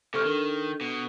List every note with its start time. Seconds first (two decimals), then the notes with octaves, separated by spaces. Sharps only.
0.14 D2 C3 A4 C#6 F6
0.25 D#3 D4
0.81 B2